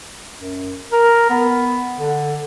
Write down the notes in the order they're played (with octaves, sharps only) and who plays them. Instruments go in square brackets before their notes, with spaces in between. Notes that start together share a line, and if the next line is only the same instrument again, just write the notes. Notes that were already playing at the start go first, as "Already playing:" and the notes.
[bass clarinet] F#2
A#4
B3
D3